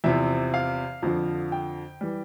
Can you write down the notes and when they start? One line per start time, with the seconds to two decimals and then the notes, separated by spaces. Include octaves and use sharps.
0.04 E2 C3 F3 E5
0.54 F5
1.03 F2 D3 F3
1.52 G5
2.01 E3 G3